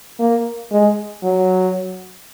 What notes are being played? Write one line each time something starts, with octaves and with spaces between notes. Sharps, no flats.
A#3
G#3
F#3